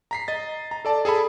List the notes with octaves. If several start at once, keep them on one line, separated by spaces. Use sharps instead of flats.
A#5 B6 C7
D#5 A6
A#5
A4 D5 A5
G#4 A4 G#5 B5